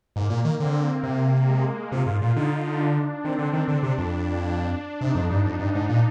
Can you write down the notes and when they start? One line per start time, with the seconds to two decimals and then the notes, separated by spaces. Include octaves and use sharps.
0.16 G#2 A#3
0.30 A#2
0.45 D#3
0.60 D3 C4
1.03 C3 A#3
1.47 G#3
1.92 C3 F4
2.06 G#2
2.22 A#2
2.35 D3 D#4
2.80 D4
3.24 D#3 C4
3.38 D3
3.53 D#3
3.68 D3 D4
3.83 C3
3.98 F2
5.01 C3 D#4
5.15 F2
5.30 G2
5.45 F2
5.60 G2
5.75 G#2
5.89 A#2